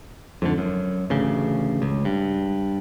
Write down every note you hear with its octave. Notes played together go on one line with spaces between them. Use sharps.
F2 G#2 D3
F#2
A1 D2 C#3
C#2
G2